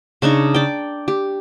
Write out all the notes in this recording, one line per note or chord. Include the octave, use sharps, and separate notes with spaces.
C#3 D4 D#4 C#5
D5 G5
G4